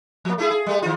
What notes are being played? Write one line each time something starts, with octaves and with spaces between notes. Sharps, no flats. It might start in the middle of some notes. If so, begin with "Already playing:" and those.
F3 A#3
A3 E4 G#4
G#4
G3 A3
D#3 F4